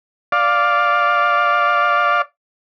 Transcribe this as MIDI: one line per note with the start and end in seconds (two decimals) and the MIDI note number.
0.32 2.22 74
0.32 2.22 77